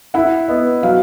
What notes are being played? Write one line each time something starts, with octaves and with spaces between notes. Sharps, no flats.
E4 F#5
B3 D#5
F#3 F5